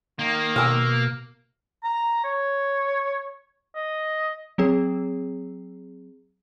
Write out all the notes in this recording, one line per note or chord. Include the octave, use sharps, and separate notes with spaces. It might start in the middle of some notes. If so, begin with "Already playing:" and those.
D#3 A#3
B2 F5 E6
A#5
C#5
D#5
F#3 C4 G#4